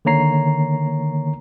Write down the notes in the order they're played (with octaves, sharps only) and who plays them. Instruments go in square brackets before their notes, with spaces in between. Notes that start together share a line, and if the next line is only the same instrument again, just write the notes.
[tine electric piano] D3 D#3 A#3 C#5 A#5 C7